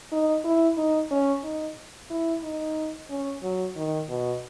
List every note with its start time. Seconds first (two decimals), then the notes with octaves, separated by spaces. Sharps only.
0.12 D#4
0.45 E4
0.77 D#4
1.11 C#4
1.44 D#4
2.10 E4
2.43 D#4
3.10 C#4
3.43 F#3
3.77 D#3
4.09 B2